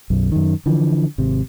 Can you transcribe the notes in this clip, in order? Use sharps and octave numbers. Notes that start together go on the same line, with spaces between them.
B1 F#2
F#2 D#3
D3 E3 F3
G#1 C3